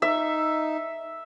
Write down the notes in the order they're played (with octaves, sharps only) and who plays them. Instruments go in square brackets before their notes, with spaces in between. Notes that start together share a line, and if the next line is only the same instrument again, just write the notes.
[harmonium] D#4 [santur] E5